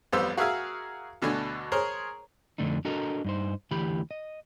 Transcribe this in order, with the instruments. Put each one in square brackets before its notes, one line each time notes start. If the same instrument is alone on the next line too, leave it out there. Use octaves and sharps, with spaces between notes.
[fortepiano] A1 F2 G3 B3 C5 E6
F#4 G#4 A#4 E5 F5 G#5
D2 B2 D3 D4 G#5
G#4 A#4 C5 C#5
[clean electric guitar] F2 D3 A3 D4 D#4
D4 F#4 A4 A#4 D#5 A#5
G2 D#4 C5
D2 E3 G4 B5
D#5